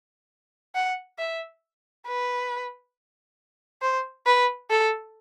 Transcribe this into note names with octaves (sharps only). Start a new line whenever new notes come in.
F#5
E5
B4
C5
B4
A4